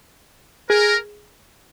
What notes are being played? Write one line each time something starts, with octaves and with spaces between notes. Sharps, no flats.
G#4 A#4